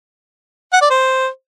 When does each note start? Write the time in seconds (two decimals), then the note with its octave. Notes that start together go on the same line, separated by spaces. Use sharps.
0.73 F#5
0.81 D5
0.90 C5